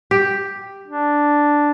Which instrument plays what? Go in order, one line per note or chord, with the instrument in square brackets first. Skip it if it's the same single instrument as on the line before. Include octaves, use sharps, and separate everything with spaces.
[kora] G4
[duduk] D4